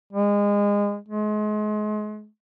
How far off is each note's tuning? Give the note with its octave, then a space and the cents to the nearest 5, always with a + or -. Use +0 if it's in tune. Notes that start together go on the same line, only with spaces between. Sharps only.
G#3 -25
G#3 +35